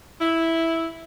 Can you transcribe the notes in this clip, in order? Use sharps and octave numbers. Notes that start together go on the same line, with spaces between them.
E4